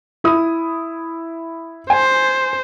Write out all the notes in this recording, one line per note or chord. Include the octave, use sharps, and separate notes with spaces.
E4 D#6
C5 G#5